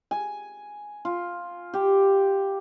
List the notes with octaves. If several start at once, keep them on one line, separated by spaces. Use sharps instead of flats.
G#5
F4
G4